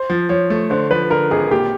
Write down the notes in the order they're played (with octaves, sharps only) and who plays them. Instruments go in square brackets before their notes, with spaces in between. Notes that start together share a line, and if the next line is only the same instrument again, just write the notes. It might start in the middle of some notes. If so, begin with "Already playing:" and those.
Already playing: [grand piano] C5
[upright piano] F3
[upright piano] F3 [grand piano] C#5
[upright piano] A3
[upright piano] D3 [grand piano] C5
[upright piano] F3 [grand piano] B4
[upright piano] D3 [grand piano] A#4
[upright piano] G#1 [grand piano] G#4
[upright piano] A#2 [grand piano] G4